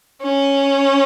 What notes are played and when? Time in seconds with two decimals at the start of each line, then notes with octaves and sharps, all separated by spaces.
0.22 C#4